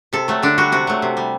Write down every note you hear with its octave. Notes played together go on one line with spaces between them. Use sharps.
C3 A4
F#3 A3
D3 D4
G3 F#4
C3 F#4
F#3 A3
C3
G3